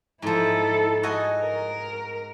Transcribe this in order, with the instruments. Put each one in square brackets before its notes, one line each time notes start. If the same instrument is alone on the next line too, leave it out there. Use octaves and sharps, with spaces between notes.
[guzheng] G#2 F3 [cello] E4 A4
[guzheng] F#4 D#5 G#5
[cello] A#4